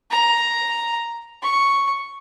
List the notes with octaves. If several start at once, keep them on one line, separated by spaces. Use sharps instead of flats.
A#5
C#6